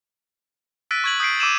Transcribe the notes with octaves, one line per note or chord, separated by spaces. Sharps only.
E6 F#6 A6 B6 D7 D#7
C#6 G#6 F#7
D#6 G6 B6 C7 D7
D6 E6 D#7 E7 F#7